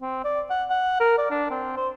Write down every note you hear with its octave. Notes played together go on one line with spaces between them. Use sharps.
C4
D5
F#5
F#5
A#4
D5
D4
C4
C5